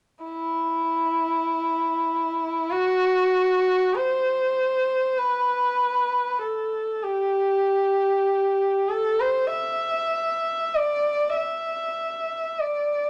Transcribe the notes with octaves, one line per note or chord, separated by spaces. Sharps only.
E4
F#4
C5
B4
A4
G4
A4
C5
E5
D5
E5
D5